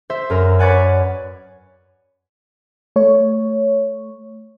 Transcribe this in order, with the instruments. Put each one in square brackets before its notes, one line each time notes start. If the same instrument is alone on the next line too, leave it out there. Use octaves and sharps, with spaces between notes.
[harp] C5 E5
F#2 A#4
B4 C#5 D5 F#5 G#5
[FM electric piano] A3 C#5